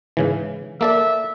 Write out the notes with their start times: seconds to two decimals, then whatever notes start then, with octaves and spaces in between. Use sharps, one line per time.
0.17 G#2 C#3 E3
0.81 A#3 A4 D5 E5